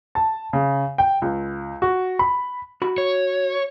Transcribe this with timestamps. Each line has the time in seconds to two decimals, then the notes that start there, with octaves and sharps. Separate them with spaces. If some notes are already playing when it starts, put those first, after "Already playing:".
0.15 A5
0.53 C#3
0.98 G5
1.22 C#2
1.82 F#4
2.19 B5
2.82 F#4 B5
2.98 C#5